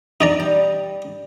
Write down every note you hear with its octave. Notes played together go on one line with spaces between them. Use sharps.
D#4 D5 D#5 A#5
G3